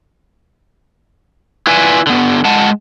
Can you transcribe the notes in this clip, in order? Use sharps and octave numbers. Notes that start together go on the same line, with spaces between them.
E4 F4 B4 D5 E5 G#5
D3 B3
G#3 F#5 A5